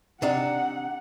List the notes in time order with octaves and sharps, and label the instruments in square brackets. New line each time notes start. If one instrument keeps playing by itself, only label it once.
[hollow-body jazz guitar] C3 D4 D#4 [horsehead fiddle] F#5